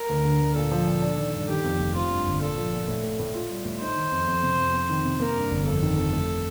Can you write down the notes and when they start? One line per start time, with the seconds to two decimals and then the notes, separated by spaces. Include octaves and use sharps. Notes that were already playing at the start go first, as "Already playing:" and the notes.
Already playing: A#4
0.09 D2
0.25 D3
0.41 D2
0.56 A#2 A4
0.71 F3
0.87 A#2
1.02 D4
1.18 D#3
1.34 G2
1.49 D#3 G4
1.64 F2
1.80 F1
1.95 C4 F4
2.11 G2
2.27 G1
2.42 A#2 A4
2.58 F3
2.73 A#2
2.88 A2
3.03 A3
3.19 A2
3.34 F4
3.51 G3
3.65 A2
3.81 D#4 C5
3.96 D#3
4.12 F2
4.27 F2
4.43 C3
4.59 F2
4.73 C4
4.89 D#3
5.05 C3
5.20 A#3 A#4
5.36 G2
5.51 G1
5.66 F2 A4
5.83 D#3
5.97 F2
6.13 A3